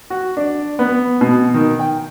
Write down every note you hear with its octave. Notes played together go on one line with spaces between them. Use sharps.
F#4
D4
B3
B2
D#3
G5